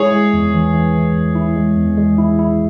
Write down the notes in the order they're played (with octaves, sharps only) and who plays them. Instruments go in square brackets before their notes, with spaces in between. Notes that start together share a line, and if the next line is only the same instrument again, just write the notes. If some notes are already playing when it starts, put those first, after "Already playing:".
Already playing: [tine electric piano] G#3 E4 [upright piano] G#4 C#5
[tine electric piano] G#3
E2
E3
E3
E3
E2
E4
G#3
E2
G#3
E4
E4